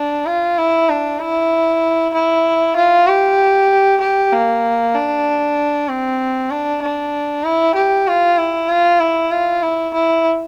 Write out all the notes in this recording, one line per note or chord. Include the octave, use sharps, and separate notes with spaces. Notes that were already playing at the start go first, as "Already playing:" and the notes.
Already playing: D4
F4
E4
D4
E4
E4
F4
G4
G4
A#3
D4
C4
D4
D4
E4
G4
F4
E4
F4
E4
F4
E4
E4